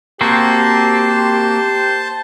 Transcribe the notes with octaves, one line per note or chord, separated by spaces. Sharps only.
A#3 C4 F#4 G4 C5 A5